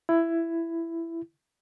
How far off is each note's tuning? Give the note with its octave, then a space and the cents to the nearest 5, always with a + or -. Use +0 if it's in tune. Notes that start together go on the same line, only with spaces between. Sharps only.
E4 +15